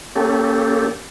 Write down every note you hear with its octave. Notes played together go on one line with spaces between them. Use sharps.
A#3 C#4 G4 A4